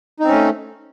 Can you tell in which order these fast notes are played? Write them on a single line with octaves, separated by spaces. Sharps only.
D#4 C4 C#4 A3